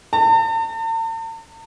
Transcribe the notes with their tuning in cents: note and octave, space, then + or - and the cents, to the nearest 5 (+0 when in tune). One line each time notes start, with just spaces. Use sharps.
A5 +45